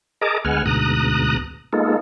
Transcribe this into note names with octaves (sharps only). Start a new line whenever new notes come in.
G#4 A#4 D#5 A5 A#5 D6
D2 G#3 B3 F#5 G#5 F6
D2 G#2 B2 A#5 D#6 F#6
G#3 A#3 B3 D#4 F4 A4